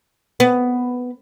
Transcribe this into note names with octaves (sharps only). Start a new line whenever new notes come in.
B3